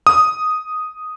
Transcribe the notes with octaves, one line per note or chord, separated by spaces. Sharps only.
D#6